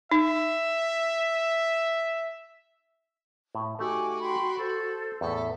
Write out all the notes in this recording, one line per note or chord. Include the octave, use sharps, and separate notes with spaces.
D#4 E5
A2
A3 D#4 F#4 G4 G#5 D6
G5 B5 C6
A4 C5 A5
E2 A2 A4 E5